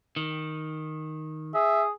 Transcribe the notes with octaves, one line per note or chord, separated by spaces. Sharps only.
D#3
G#4 E5